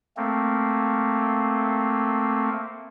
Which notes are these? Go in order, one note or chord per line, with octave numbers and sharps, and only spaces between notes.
A3 A#3 C4